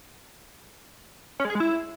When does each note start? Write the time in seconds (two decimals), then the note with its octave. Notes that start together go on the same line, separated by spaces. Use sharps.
1.40 C#4
1.45 G#3
1.50 G#4
1.55 G#3
1.60 E4